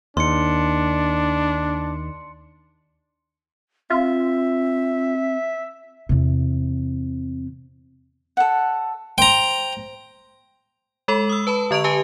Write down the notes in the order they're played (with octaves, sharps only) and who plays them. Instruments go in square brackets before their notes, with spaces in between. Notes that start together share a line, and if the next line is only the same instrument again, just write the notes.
[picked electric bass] D#2 [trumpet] D4 [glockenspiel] C6 C#7
[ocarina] C4 [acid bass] F4 [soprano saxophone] E5
[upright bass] E2 C3
[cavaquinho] A4 F#5
[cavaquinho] C5 [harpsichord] G5 A#5
[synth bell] G#3 A4 B5 F#7
D#6 E6
B4 A5 B5
D3 D#5 C#6 D7 F7
G4 B4 G#5 A5